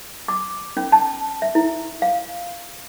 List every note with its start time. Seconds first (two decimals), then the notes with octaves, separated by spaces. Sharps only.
0.28 D6
0.77 C#4
0.92 A5
1.42 E5
1.55 E4
2.02 F5